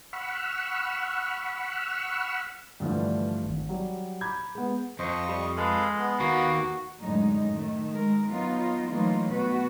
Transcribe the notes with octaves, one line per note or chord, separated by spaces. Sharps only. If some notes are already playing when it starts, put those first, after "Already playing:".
F#5 B5 C#6 E6 F6
G2 D3 E3 F3 A3 D4
G#1
F#3 G3
A#5 B5 D6 G6 G#6
G#3 B3
F2 C5 D#5 C#6
G3
G#3 A4 B4 F5
B3
D#2 A#3 F#4
F#2 A2 D3 G#3 D#4
D#3 A3
G#3 A#4
F#3 B3 D#4 F4
E3 F#3 A3 A#3 D#4 F4
B2 B3 F#4 B4